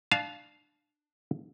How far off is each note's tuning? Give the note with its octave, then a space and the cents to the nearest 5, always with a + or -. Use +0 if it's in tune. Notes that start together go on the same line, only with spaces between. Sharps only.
D4 +20 F5 +0 A5 -25